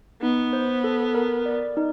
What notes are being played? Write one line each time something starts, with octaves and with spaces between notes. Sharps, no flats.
B3 D#4
C5
A4
A#4
D5
D#4